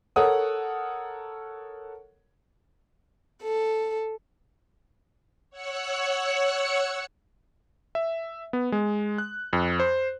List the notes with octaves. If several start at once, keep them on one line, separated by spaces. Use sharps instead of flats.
A4 A#4 C#5 F#5 D#6
A4
C#5 F#5 E6 F#6 C#7
E5
B3
G#3
F#6
F2
C5